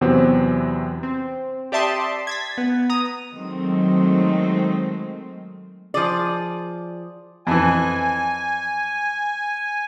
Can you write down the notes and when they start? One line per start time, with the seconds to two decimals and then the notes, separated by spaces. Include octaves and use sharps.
0.01 E2 C3 E3 F#3 B3 C4
1.03 C4
1.72 G4 D5 E5 A5 C6 D#6
2.27 G#6 A6 B6
2.58 B3
2.90 A#5 D#6
3.32 D#3 F#3 G#3 A3 C4
5.94 F3 G#4 D5
7.47 F2 E3 G#5